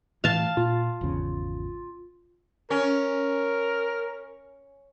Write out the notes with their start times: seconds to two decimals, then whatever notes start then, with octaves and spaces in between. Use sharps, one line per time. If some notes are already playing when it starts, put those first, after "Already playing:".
0.24 A2 E3 F5 A5
0.57 A#2 F4
1.01 G#1 E2 C#3
2.70 C#4 A#4